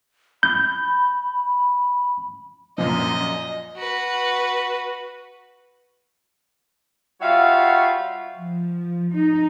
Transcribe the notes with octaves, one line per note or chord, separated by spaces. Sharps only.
B5 G6
F#2 A#2 F3 D#5
F#4 B4
G3 F4 F#4 C#5 E5 F5
F3
D#4